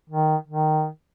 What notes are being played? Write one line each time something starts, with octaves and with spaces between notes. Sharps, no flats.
D#3
D#3